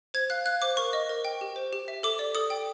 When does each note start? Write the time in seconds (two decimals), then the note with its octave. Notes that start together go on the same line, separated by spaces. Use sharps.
0.14 C5 G#6
0.30 F5 F#6
0.46 F5 F#6
0.62 C5 D6
0.77 A#4 C#6
0.93 D#5
1.09 A#4
1.25 G5
1.41 G4
1.56 C5
1.73 G4
1.88 E5
2.03 A4 D6
2.19 D5
2.35 A4 D#6
2.50 G5